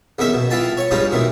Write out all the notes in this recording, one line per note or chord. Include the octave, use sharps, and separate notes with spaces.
E2 D#3 C#4 E5
B2
E4 F4 B4 G5 A5
C#5 C#6
G2 G3 G#3 C#4 D#4 F4
B2 D#3 E3